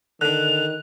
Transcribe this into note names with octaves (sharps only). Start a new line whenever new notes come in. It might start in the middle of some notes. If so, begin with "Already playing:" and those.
D3 D#3 D4 F#6 F7